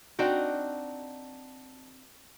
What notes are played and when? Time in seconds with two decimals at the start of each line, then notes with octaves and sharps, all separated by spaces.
0.19 C4 D4 D#4 F#4